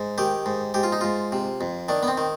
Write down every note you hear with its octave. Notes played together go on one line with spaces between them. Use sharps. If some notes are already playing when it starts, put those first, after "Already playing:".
Already playing: G#2
D#3 G4
G#2
G#2 G4
F4
D#4
G#2 F4
C3
F2
D#3 D4
B3
C4
D#3